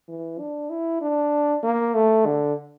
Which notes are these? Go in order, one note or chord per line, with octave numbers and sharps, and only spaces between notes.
E3
D4
E4
D4
A#3
A3
D3